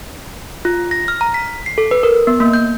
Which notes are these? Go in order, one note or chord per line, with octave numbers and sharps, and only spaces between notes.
F4
A#6
F6
A#5
B6
C7
A4
B4
A#4
B3
A#3
G6